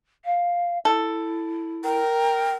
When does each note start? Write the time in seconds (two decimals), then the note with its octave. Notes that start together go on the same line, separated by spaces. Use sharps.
0.25 F5
0.85 E4 A4
1.84 A#4 G5